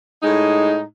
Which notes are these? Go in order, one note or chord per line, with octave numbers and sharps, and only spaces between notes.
A2 G#3 D#4